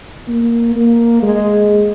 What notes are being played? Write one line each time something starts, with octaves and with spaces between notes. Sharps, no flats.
A#3
A#3
G#3